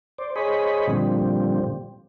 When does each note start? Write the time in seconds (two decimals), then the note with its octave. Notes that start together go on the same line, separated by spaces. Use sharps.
0.18 C5 D5
0.36 G#4 C5 C#5 D#5 B5
0.87 A#2 D3 F3 G3 C4